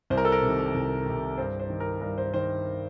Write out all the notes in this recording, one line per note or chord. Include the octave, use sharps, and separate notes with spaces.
C2 C5
A#4
A4
A#4
C3 D#3
C2
C3 D#3
G2 C5
C5
D#3
A#4
G2 A#4
C5
D#3 C5